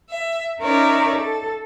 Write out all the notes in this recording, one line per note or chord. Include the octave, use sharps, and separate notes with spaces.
E5
C#4 D#4 A#4 C#5 D5 E5
A4